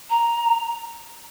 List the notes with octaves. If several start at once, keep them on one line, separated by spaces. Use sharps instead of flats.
A#5